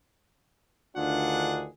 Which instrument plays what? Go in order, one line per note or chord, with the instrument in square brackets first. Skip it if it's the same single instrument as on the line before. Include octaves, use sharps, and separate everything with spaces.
[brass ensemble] D2 D#3 D4 F4 G#4 F#5